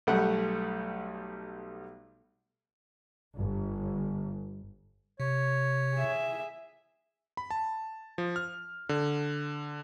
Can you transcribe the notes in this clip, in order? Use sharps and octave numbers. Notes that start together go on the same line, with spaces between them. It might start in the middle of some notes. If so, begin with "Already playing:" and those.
B1 B2 G3 A3 F#5
G1
C3 C#5
G#4 E5
B5
A5
F3
F6
D3